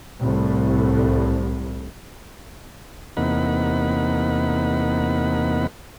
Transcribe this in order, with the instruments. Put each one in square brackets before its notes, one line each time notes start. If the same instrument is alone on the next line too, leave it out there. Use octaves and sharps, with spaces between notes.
[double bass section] C2 A2
[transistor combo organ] E2 C3 A#3 D#4 F#5 B5